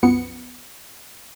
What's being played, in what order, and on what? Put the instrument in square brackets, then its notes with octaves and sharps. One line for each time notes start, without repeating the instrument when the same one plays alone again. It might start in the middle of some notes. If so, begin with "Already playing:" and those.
[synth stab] C2 F#2 F3 B3 C#7